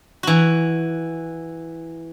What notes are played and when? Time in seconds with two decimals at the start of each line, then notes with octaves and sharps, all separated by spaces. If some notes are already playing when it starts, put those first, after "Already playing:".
0.23 E3 F#4